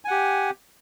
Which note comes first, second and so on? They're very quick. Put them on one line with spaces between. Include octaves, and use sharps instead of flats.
G#5 F#5 G4